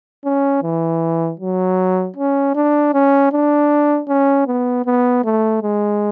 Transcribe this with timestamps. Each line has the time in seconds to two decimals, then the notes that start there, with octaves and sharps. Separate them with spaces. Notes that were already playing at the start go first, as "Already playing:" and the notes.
0.25 C#4
0.63 E3
1.40 F#3
2.16 C#4
2.55 D4
2.94 C#4
3.32 D4
4.08 C#4
4.47 B3
4.86 B3
5.24 A3
5.63 G#3